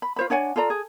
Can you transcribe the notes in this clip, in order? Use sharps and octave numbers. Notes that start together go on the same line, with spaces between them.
B5
F4 C5 B5
D4 C#5 F#5 G#5
F4 A4 D5 A#5
G#4